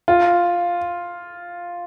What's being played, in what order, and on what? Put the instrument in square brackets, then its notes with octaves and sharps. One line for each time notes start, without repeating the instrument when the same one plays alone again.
[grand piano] F4